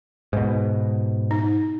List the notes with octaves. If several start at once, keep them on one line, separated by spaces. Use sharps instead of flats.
G#2 B2
D#4